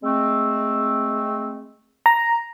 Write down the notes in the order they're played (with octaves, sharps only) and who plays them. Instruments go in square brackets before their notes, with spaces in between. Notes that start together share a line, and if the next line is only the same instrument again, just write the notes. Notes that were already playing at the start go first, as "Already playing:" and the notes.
[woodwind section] G#3 A3 C4
[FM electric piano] A#5